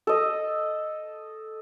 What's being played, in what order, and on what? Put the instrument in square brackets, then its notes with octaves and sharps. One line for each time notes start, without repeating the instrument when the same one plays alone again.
[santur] A4 D#5